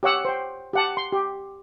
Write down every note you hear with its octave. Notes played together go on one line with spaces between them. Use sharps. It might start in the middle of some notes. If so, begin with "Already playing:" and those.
G4 C#5 F#5 E6
C5 G5
G4 F#5 A5
C6
G4